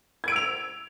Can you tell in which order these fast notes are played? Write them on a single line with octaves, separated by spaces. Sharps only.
G#6 D7 E6 F7